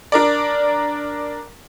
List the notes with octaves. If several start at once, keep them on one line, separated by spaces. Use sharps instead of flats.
D4 A#4 D5